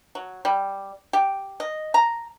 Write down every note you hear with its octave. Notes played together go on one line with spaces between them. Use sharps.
F#3
G3
G4
D#5
A#5